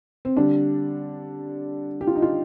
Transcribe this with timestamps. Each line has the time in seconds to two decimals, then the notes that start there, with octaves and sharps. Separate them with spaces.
0.25 C4
0.37 D3 G3 D4
2.01 G4
2.07 F4
2.15 D#4
2.22 F4